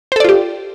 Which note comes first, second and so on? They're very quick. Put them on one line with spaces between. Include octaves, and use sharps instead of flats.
C5 A4 D5 F4 G4